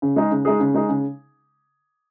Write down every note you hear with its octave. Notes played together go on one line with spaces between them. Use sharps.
C#3
G#3 D#4 G#4
C#3
G#3 D#4 G#4
C#3
G#3 D#4 G#4
C#3